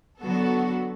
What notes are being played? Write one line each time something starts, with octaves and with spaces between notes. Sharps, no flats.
D3 F#3 B3 F#4 A4